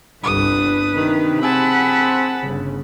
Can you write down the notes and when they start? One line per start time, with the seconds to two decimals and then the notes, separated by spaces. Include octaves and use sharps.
0.24 G1 C2 G2 D4 B4 D#6
0.94 C3 D#3
1.42 C4 G#4 F#5 A5 B5
2.43 G1 C#3